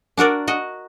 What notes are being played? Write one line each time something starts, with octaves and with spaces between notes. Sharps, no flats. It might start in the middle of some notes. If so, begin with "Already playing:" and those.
D4 F#4 A#4 D5
F#4 D#5